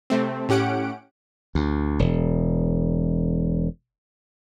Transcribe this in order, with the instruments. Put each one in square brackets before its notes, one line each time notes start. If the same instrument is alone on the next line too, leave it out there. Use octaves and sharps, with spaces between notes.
[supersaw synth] C3 A3 C4
A2 C#4 G4 F#5 D7
[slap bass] D2
E1